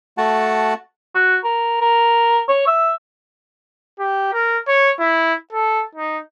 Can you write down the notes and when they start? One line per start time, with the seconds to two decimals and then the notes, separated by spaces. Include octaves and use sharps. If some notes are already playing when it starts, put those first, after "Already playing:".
0.18 A3 F#4 F#5 A5
1.15 F#4
1.44 A#4
1.81 A#4
2.49 C#5
2.67 E5
3.99 G4
4.33 A#4
4.68 C#5
5.00 E4
5.53 A4
5.95 D#4